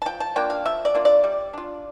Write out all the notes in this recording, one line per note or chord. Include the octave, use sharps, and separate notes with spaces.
A5
F3 G5
A5
A#3 D4 F4 G5
F5
F3 E5
D5
A#3 D4 F4
D5
G3
D4 F4